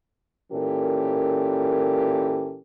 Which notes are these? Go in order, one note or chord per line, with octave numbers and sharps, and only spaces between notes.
A#2 E3 C#4 G4 A4 A#4